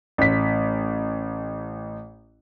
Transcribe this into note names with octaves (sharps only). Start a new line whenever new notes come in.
A1 B6